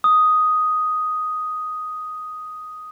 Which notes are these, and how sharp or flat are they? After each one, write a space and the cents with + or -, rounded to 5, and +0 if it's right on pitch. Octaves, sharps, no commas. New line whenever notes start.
D#6 +5